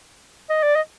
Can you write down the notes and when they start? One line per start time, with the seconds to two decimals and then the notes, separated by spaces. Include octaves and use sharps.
0.50 D#5
0.63 D5
0.76 D#5